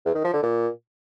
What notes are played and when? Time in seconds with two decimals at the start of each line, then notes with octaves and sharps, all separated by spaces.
0.05 E2
0.15 D#3
0.24 F3
0.34 D3
0.43 A#2